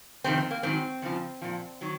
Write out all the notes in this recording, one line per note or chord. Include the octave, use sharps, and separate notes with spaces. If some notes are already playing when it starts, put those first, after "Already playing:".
F2 C3 D#3 C4
C4
A#3
G#2 D#3 F#3 C4
F2 C#3 F3
A#2 F3
D#3 F#3